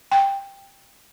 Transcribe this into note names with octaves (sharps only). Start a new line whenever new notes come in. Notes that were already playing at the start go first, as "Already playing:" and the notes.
G5